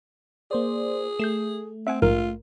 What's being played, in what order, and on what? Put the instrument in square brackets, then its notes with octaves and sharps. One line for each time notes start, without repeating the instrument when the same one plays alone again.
[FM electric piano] A#3 C5 D5 [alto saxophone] G#4
[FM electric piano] A3 [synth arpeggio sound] G6 C7 E7
[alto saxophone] C4 [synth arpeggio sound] E5 F#5 G#5
[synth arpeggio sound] A#1 G#2 A#4 [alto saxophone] F4